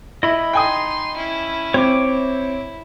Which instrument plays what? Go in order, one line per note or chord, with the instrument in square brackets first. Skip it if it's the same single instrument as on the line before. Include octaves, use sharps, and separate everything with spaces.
[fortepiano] E4 [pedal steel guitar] D#5 B5
[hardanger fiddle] D#4 C6 [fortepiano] G5 G#5 D#6
[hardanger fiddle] C#4 E4
[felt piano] C4 [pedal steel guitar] C#5 D6
[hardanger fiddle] E4